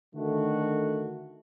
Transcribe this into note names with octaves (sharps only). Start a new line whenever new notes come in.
D3 D#3 A3 F#4